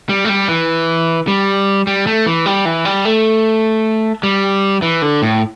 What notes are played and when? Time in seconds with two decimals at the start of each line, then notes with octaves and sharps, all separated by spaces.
0.09 G3
0.25 A3
0.29 G3
0.48 E3
1.28 G3
1.87 G3
2.07 A3
2.26 E3
2.46 G3
2.65 E3
2.85 G3
3.05 A3
4.23 G3
4.82 E3
5.02 D3
5.22 A2